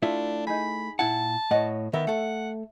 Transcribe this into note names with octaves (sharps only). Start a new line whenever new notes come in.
A3 D4 E4 F4 E5
D#4 G#4 B5
A#2 E4 F#5 A5
A2 C#5 D#5 F#5
D#3 B3 A#4 E5
A3 A4 F#5